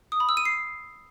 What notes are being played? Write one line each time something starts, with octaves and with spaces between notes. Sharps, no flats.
D#6
B5
E6
D#7
C7